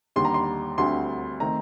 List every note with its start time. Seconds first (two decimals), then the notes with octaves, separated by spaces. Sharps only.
0.16 D#2 D3 G3 C6
0.25 A#5
0.34 C6
0.78 D2 D3 G3 C4 C6
1.40 D#3 A3 C4 A#5